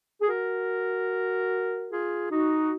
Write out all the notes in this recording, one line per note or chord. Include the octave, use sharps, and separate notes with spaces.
G#4
F#4 A#4
F4 G#4
D#4 F#4